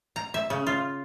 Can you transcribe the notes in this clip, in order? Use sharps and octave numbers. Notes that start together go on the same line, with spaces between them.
A#5
E5
C#3
F4